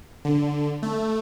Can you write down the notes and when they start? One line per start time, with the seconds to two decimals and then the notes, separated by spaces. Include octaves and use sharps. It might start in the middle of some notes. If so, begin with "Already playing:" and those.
0.25 D3
0.83 A3